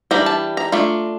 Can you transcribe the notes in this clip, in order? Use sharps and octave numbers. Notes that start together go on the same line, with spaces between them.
E3 G3 D4 A#5
A5
A#5
A3 D4 F4